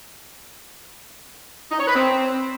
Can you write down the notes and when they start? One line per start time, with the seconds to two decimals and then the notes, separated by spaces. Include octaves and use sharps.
1.71 D#4
1.80 C#5
1.88 B4
1.96 C4